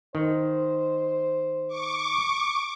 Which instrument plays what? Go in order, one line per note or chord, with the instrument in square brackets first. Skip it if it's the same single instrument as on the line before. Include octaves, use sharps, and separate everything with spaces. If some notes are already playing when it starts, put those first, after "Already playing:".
[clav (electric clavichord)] D#3 [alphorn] C5
[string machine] C#6 D6